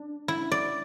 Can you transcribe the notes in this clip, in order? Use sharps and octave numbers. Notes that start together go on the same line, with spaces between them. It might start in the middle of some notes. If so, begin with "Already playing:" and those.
Already playing: D4
E4
D5